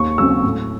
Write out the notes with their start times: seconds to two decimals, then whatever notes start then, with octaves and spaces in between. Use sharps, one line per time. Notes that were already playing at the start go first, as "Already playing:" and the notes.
Already playing: D#2 C#6
0.18 C#3 F#3 C4 E6
0.44 A2